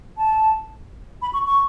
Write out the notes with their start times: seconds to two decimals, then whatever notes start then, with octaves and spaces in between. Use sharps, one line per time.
0.17 A5
1.22 B5
1.33 C#6
1.45 C#6